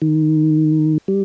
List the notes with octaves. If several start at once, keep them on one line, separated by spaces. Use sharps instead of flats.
D#3
G3